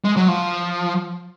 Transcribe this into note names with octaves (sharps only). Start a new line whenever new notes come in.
G#3
F#3
F3